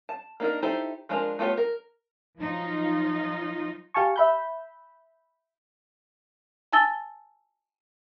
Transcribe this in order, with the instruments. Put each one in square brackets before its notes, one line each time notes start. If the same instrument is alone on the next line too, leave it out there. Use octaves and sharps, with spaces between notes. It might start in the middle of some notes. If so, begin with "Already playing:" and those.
[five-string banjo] A5
A#3 D4 D#4 A#4
D#4 E4 G4 A4 C5
F3 G#3 D4 F4 A#4
A3 B3 F4 G4 C#5
A#4
[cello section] F3 F#3 D#4 F4
[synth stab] G4 F5 G#5 A5 C#6
E5 B5 G6
[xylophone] G#5 A5 E6 A6 G7